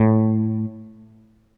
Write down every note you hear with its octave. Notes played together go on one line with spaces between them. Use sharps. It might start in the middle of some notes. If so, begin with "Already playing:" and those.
Already playing: A2